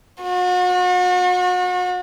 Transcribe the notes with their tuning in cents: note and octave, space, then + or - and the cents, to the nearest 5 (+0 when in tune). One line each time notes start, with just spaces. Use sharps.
F#4 -40